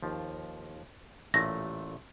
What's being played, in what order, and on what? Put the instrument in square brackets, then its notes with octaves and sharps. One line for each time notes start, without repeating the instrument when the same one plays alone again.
[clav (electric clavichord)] D#2 F3
[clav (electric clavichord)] A1 A#2 A3 [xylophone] A#6